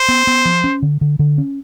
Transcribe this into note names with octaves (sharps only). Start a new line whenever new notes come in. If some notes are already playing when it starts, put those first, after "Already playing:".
Already playing: C5
B3
B3
F3
C#4
D3
D3
D3
C#4